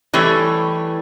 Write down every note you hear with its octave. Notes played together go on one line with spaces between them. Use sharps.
E3 G3 A3 C#5